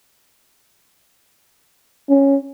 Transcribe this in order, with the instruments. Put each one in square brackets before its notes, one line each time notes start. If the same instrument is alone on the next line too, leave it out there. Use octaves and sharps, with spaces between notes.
[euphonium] C#4